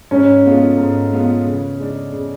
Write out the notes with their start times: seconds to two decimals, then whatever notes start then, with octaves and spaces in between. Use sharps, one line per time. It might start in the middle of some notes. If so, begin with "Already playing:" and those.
0.11 G#2 C#4
0.45 G#3 B3 F4 A4
0.78 G#2
1.11 G#3 B3 F4 A4
1.45 C#3
1.79 G#3 D4
2.12 C#3